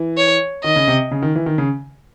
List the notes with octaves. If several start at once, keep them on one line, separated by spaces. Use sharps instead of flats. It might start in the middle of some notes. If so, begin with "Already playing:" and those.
Already playing: E3
C#5
D#3 D#5
C#3
C3
C#3
D#3
E3
D#3
C#3